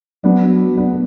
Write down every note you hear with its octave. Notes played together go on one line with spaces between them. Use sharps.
F#3 B3 D4
B3 D4